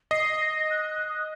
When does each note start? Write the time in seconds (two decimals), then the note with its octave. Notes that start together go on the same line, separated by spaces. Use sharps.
0.11 D#5 C7
0.41 A#6
0.70 F#6
0.90 F#6
1.09 D#6